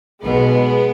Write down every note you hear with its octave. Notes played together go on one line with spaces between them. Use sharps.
B1 B2 G#3 B3